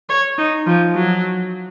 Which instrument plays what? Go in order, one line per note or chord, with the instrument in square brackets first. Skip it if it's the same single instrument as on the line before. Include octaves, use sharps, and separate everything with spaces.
[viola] C#5
D#4
F3
F#3